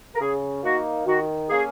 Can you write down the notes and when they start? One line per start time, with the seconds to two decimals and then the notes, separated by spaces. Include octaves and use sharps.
0.15 A#4
0.20 C#3 G#4
0.63 A#3 D#4 F#4
1.06 D#3 F#4
1.49 A#3 C#4 G#4